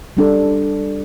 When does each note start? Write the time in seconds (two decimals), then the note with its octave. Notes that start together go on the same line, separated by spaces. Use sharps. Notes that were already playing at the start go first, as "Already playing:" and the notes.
0.17 G3 D4 A4